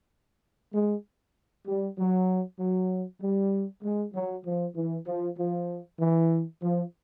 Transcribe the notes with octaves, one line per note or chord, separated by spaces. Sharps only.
G#3
G3
F#3
F#3
G3
G#3
F#3
F3
E3
F3
F3
E3
F3